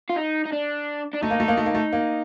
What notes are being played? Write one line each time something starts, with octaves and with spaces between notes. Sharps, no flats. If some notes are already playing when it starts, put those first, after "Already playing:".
F4
D#4
D#4
D4
D4
A3 D#4
A#3
A3
A#3
A3
A#3
A3
A#3